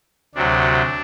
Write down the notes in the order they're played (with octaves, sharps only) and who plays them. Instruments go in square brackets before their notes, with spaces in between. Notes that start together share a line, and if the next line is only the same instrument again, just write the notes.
[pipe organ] D2 C3 F#3 D4